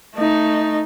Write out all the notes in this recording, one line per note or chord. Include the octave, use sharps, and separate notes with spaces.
A3 D#4